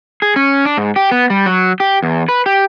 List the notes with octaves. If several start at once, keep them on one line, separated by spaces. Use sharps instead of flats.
G#4
C#4
D4
G#2
G4
B3
G3
F#3
G4
E2
B4
G4